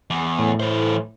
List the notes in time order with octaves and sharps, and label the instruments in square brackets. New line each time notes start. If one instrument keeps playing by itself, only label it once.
[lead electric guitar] E2
[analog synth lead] A2
[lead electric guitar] E3 C5